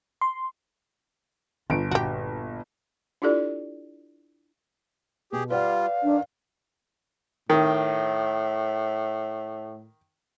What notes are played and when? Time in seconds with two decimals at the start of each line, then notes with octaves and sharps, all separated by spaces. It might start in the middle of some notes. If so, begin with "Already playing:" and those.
0.21 C6
1.70 G1 F4 D7
1.91 A#1 F#4 G4
3.22 D4 E4 F4 G4 A4 D5
5.33 B2 G4 G#4
5.50 G3 F4 B4 D5 F5 F#5
6.03 D#3 D4
7.50 A2 D#3